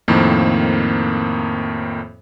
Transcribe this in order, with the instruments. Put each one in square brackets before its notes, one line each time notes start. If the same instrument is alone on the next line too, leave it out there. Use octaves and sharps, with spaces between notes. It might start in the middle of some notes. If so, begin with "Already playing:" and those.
[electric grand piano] F2 A2 D#3 A#3 C4